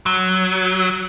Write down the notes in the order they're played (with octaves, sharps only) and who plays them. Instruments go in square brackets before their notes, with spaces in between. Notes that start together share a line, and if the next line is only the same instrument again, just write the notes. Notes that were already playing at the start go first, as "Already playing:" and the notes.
[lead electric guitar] F#3